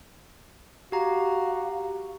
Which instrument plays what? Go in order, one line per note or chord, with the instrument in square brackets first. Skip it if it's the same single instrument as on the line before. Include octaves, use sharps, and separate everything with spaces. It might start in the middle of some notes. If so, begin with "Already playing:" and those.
[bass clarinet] F#4 [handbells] G4 A#5 [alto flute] F5